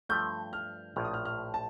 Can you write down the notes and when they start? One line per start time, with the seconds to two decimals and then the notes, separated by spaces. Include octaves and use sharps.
0.09 G2 F3 A3 G6
0.53 F6
0.96 A#1 A2 F3 F6
1.04 D#6
1.14 F6
1.25 F6
1.54 A5